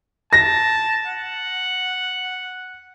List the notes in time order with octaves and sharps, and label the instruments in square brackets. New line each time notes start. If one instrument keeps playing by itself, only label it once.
[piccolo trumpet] A5 [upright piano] A#6
[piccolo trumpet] F#5